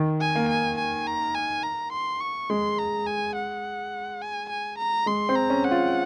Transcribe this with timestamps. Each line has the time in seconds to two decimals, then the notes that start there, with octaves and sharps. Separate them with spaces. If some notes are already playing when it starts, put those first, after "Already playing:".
Already playing: D#3
0.21 G#5
0.35 A#3
0.49 G#5
0.78 G#5
1.07 A#5
1.35 G#5
1.63 A#5
1.92 C6
2.21 C#6
2.49 G#3 C6
2.78 A#5
3.07 G#5
3.36 F#5
4.21 G#5
4.49 G#5
4.78 A#5
5.06 G#3 C6
5.29 C4
5.35 A#5
5.50 C#4
5.64 F#5
5.71 F4